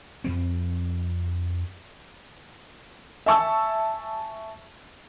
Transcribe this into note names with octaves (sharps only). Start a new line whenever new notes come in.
F2 F3 C4
E5 G#5 A5 C#6 E6